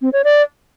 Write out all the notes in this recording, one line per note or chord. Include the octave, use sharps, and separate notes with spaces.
C4
C#5
D5